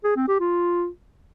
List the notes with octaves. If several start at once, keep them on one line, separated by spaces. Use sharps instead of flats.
G#4
C4
G4
F4